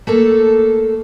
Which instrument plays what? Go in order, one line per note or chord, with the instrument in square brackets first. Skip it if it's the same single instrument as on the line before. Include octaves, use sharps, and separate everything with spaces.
[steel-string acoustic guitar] A3 A#3 A4